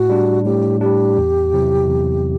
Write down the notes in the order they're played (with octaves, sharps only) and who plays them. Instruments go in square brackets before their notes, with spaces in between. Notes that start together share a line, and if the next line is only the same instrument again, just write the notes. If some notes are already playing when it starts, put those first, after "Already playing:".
Already playing: [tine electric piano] A2 [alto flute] F#4
[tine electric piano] G3 D4
[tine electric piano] A2 [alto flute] G4
[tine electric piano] D4 [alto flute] G4
[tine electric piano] G3
E2
C3 F#3 C4 E4
E2